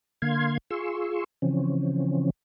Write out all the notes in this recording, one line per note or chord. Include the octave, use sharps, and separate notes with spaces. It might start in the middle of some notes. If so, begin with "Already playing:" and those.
D3 A#3 F5 C6 G#6
F4 G#4 C6 C#6 E6
C#3 E3 F3 C4 C#4